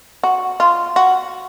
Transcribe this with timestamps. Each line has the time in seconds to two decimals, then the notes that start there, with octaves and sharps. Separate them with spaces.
0.23 F#4
0.60 F4
0.96 F#4